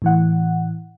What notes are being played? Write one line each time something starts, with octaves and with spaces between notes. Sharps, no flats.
A2 E3 F#5